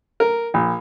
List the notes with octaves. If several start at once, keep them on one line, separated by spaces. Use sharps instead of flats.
A#4
A#1